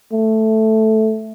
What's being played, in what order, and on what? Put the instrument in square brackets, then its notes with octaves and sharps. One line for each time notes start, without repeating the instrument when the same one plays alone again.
[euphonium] A3